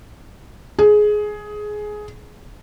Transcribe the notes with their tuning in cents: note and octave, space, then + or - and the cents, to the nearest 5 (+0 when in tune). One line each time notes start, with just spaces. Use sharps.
G#4 +15